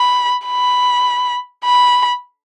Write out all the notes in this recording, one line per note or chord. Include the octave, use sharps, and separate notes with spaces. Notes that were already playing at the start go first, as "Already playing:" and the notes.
Already playing: B5
B5
B5